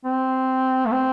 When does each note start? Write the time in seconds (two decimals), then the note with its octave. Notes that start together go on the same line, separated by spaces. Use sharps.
0.05 C4
0.86 A3
0.92 C4